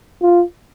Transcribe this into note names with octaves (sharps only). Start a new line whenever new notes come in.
F4